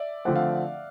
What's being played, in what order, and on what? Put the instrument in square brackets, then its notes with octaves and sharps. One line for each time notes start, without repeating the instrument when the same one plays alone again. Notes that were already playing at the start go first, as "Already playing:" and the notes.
Already playing: [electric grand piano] D5 E5
[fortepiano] D3 F3 A3 C4 [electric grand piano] F#5
[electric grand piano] F5